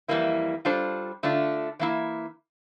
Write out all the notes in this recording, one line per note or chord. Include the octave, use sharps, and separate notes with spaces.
F2 E3 G3 A#3 E4
G3 D4 F4 A4 C5
D3 A3 D4 F4
E3 A#3 E4